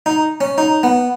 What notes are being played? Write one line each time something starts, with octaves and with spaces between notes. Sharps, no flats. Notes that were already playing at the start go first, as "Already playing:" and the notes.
D#4
C#4
D#4
B3